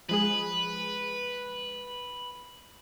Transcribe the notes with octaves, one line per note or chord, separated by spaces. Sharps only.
F3 G#3 G#4 B4